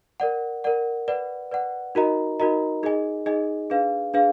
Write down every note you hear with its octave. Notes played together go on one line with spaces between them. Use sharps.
A#4 D5 F#5
A#4 D5 F#5
B4 D5 F#5
B4 D5 F#5
D#4 F#4 A#4 D#5 A#5
D#4 F#4 A#4 D#5 A#5
D#4 G#4 D#5 G#5
D#4 G#4 D#5 G#5
D4 G#4 B4 F5
D4 G#4 B4 F5